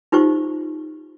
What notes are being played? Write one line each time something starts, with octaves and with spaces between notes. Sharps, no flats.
D#4 F4 G4 C5 C#6